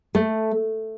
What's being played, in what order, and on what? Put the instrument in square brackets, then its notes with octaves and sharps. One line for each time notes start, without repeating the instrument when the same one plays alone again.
[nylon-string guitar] A3